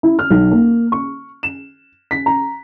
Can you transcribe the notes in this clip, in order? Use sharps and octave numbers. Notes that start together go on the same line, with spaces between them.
E4
F6
B1
A#3
C#6
E7
B6
A#5